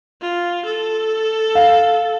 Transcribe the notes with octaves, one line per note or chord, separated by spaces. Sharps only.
F4
A4
F5